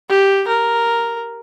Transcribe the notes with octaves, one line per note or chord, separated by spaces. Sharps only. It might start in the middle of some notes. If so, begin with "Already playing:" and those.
G4
A#4